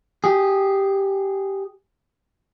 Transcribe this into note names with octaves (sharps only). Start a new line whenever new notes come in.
G4 G#4